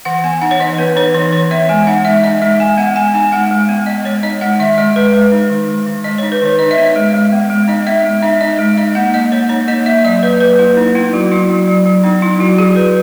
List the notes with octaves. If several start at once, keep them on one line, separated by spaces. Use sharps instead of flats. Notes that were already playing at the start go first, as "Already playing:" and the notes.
E3 F#5
B3 G#5
D#4 F#5
C#5
E3 D#5
B3 B4
D#4 C#5
E3 C#5
E3 C#5
B3 E5
G#3 G#5
D#4 F#5
G#3 E5
D#4 D#5
G#3 E5
G#3 G#5
B3 F#5
G#3 G#5
D#4 G#5
G#3 F#5
G#3
B3
B3 D#5
G#3 C#5
D#4 D#5
G#3 F#5
D#3 E5
G#3 D#5
G#3 B4
G#3
D#4
D#3
G#3
D#3
G#3 D#5
C#5
D#4
B4
D#3 C#5
D#4 D#5
E5
B3
D#5
G#3
G#3
B3
G#3
D#4 D#5
B3 E5
G#3
D#4 E5
D#4 D#5
G#3
D#4 D#5
A#3 F#5
A#3 D#5
A#3 C#5
D#4 C#5
A#3 D#5
A#3 E5
F#3 D#5
A#3 B4
F#3 B4
A#3 E4
A#3 D#4
B3 E4
F#3 F#4
F#3 E4
F#3
F#3
F#3
B3 D#4
F#3 E4
F#3 F#4
F#3 G#4
F#3 B4